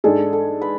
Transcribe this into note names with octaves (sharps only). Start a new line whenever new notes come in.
G#2 G#3 D4 G#4 A4
A4
B4